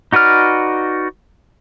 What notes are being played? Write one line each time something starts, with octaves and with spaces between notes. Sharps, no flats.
D#4 F#4 B4 D5 F6